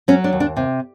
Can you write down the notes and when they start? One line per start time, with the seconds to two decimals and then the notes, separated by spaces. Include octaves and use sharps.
0.08 F#3 C#4
0.24 D4
0.33 D#2
0.40 D4
0.57 C3